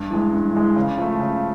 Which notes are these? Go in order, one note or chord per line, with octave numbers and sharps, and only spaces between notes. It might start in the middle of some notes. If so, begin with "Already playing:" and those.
Already playing: G2
E3 G#3
G2
E3 G#3
C#3
F3 A3
C#3